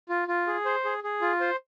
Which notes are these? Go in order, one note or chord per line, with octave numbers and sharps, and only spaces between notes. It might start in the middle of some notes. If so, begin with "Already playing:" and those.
F4
F4
G#4
C5
G#4
G#4
F4
C5